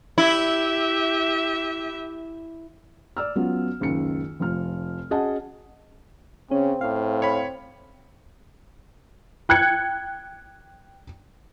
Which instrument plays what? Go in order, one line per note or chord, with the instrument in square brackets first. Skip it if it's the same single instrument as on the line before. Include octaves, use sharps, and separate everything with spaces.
[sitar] E4 [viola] G4 E5
[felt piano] D5 E6 F6
F#3 B3 C#4 F4
F#1 C#2 D#3 C#7
F1 F3 F6
C#4 F#4 G#4 D#5 F#5 A5
[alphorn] C#3 [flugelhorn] C4 [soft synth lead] C#4
[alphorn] A2 [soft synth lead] F5
[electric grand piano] C#5 B5
[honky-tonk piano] G5 F#6 G#6 C#7